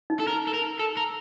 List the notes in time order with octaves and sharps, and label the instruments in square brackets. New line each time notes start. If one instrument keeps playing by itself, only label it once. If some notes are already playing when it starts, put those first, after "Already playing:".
[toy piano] D#4
[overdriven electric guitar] A4
A#4
A4
A#4
A4
A#4